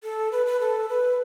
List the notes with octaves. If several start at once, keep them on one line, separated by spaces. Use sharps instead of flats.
A4
B4
B4
A4
B4